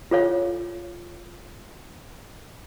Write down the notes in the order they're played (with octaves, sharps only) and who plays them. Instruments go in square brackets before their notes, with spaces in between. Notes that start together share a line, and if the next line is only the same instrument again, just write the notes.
[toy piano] F4 A4 C#5 F5